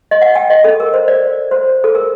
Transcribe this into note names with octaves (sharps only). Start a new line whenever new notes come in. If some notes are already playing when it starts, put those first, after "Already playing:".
D#5
F#5
G5
D#5
A4
A#4
C5
D5
C5
A4
A#4